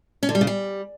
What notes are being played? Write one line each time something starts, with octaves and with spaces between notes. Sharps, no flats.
C#4
D3
G3
C#3
G3